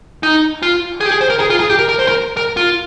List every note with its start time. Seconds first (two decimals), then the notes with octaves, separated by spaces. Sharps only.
0.23 D#4
0.63 F4
1.01 G#4
1.06 G4
1.11 G#4
1.21 C5
1.30 A#4
1.40 G#4
1.50 F4
1.60 G#4
1.70 G4
1.79 A#4
1.89 A#4
1.99 C5
2.08 A#4
2.37 A#4
2.57 F4